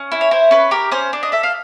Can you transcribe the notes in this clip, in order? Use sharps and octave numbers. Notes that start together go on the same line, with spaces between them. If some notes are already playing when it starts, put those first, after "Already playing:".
Already playing: C#4
E4
C#5
E4 C5
C#4 B4
G4 A#4
C#4 C5
D4
D#5
A4 E5
F5